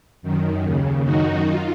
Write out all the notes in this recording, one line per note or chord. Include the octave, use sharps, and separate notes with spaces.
F#2 D#3
D#2 C#3
F#2 D#3 D#4 F#4
F4